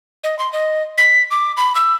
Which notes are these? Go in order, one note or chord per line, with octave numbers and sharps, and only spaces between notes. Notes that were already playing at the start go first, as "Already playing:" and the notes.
D#5
C6
D#5
B6
D6
B5
E6